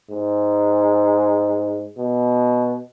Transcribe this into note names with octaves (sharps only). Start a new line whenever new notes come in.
G#2
B2